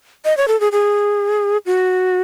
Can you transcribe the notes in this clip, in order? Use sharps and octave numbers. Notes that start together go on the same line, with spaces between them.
D#5
C#5
A4
G#4
G#4
F#4